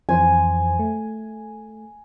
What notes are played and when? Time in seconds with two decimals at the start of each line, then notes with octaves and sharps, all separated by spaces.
0.09 F2 E3 C5 G#5
0.79 A3